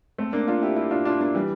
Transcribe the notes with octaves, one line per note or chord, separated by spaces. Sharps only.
A3 C4
A#3 D4
D4 F4
E4 G4
E4 G4
D4 F4
D4 F4
A#3 D4
E3 G3